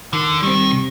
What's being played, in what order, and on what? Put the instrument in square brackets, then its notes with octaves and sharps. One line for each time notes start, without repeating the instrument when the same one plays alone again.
[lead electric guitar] D3 [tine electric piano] D#3
[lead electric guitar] D#3 [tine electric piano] G3 C4
[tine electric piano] C3